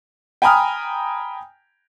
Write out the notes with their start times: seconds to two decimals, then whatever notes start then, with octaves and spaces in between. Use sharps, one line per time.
0.42 G5 G#5 A#5 B5 D#6 F6